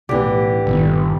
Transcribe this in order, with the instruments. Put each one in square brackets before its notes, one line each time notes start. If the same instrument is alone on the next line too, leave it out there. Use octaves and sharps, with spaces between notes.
[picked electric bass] B1 A2 [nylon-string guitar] D3 E3 [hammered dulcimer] G4
[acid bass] G1 [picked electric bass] A#2 D#3 B3